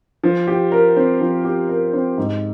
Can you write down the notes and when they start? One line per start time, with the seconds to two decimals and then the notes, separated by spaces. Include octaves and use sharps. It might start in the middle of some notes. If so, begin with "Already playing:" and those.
0.23 F3
0.47 G4
0.72 A#4
0.96 C4
1.21 F3
1.45 G4
1.69 A#4
1.93 C4
2.18 G#2